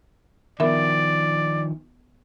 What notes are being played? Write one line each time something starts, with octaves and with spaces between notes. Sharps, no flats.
D#3 F3 B3 A#4 D5 E5